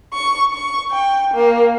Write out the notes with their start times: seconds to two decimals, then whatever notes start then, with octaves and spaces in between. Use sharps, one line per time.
0.15 C#6
0.54 C#6
0.92 G5
1.34 A#3